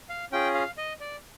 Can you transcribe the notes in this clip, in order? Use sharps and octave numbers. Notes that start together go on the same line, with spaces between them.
F5
C#4 F4 G#4 G5
F5
D#5
D5